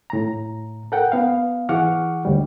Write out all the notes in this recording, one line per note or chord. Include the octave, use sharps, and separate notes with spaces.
A2 A#5
A4 A#4 F#5 G5
B3 F5
E3 G#4 F#5 C#6 D6 F6
D2 G3